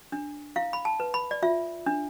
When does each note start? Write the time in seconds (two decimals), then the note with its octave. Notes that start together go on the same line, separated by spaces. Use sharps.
0.12 D4
0.56 E4 F5
0.73 B5
0.85 A5
1.00 B4
1.14 B5
1.31 D5
1.43 F4 E5
1.86 D4